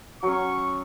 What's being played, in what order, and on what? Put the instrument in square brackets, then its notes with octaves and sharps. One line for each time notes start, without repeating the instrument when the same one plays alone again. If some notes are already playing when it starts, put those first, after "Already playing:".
[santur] F#3 C#4 [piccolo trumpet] C#6